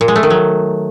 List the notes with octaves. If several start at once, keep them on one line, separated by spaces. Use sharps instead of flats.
A#2
G#3
A3
D#3
F#3